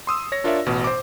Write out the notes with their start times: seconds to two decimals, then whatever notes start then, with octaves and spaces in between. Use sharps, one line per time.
0.07 C6 D#6 E6
0.32 C#5 A#6
0.44 D4 F4 A#4 C#5 D5 E5
0.66 A1 B2
0.84 C5 D6